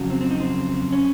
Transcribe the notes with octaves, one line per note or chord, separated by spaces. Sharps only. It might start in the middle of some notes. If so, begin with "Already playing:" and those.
Already playing: F2 C#3 F#3
C4
C4
D#4
C4
C#4